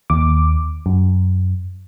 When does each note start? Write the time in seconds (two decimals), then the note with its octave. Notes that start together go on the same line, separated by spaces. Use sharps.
0.10 D#2 D6
0.86 F#2